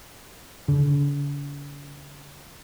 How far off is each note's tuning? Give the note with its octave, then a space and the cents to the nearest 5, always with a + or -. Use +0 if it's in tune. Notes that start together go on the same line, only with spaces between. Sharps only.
D3 -45